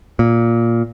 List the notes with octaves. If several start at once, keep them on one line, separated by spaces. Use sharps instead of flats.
A#2